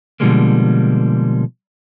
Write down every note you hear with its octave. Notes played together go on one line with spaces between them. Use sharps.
B2 D3 F3 G3 G#3 A#3